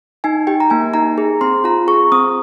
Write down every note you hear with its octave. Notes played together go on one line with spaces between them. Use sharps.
D#4 G#5
G4 G5
A#5
A#3 G#5
D#4 A#5
G#4
C4 C6
F4 A#5
G#4 C#6
C4 D#6